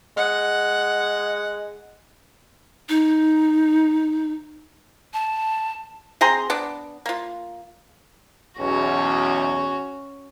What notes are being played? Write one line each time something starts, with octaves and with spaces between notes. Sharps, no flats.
G#3 F#5
D#4
A5
C4 G#4 A#5 C6
B3 D4
A#3 F4
B1 E2 C#4 F#4